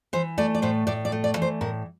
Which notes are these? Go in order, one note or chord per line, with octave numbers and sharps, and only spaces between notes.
E3 C5
A3 D5
D5
A2 C5
A2 D5
D5
A3
D5
E3
C5
A2 A#4